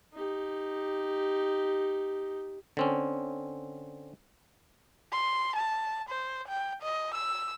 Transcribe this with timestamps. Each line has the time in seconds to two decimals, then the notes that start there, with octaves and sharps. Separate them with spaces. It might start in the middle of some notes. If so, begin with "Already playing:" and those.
0.14 D#4 G4
2.77 D3 C4 C#4
5.12 C6
5.56 A5
6.09 C5
6.48 G5
6.82 D#5
7.14 E6